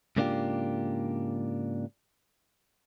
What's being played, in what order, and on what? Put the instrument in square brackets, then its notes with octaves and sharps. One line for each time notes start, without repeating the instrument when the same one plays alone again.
[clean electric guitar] G#2 C#3 A#3 D4 F4 G4